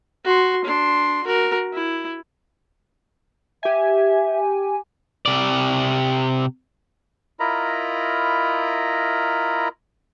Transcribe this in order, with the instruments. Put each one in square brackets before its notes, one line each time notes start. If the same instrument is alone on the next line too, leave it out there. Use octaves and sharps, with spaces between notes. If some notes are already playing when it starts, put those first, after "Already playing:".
[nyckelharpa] F#4 C6
D4 C6
F#4 A#4
E4
[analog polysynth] G4 G#5 [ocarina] E5
[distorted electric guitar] C3 D5
[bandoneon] E4 F4 A#4 D#5 A#5 B5